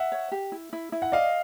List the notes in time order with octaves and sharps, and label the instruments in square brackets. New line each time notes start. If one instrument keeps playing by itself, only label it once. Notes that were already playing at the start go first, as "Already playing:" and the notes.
Already playing: [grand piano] E5 F#5
[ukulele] C#5
G4
E4
E4
E4
[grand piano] F#5
[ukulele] D5 [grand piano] D#5 F5